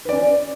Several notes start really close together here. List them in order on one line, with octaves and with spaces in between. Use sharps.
B4 D5 C#4